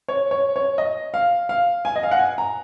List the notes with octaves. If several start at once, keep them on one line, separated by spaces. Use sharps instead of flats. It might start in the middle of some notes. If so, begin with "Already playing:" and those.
C#5
C#5
C#5
D#5
F5
F5
G#5
D#5
F5
F#5
G#5
A#5